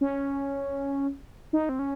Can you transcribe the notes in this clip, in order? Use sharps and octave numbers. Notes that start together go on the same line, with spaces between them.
C#4
D#4
C4
C#4